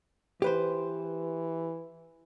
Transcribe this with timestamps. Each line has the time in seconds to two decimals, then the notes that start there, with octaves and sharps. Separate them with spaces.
0.42 E3 G4 B4 C5